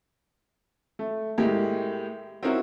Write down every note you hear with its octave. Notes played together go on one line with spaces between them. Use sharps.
A3
A2 G#3 A#3 E4 G4
C4 C#4 D#4 E4 F#4 A#4